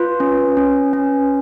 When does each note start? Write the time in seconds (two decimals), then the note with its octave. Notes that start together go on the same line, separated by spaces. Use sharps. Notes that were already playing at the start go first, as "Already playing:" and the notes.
Already playing: F4 B4
0.20 C#4
0.57 C#4
0.93 C#4